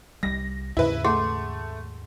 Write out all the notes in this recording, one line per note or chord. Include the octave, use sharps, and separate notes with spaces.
C2 G3 A#6
D#2 G#2 C#3 E4 B4
A3 G#4 F#5 C6